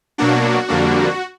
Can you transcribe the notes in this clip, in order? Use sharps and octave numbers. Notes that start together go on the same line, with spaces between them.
B2 F#3 A#3 D4 F#4
F2 D3 G3 A#3 D4